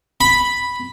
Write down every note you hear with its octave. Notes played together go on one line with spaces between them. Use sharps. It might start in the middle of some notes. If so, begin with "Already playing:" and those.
B5